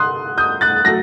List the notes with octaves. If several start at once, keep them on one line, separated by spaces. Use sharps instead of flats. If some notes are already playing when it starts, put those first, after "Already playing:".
Already playing: G2 D3 C6 D#6 F#6
D#6 G6
F#6 A6
F#3 A3 A#6